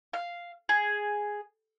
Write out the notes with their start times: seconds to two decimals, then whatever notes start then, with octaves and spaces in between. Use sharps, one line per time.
0.13 F5
0.69 G#4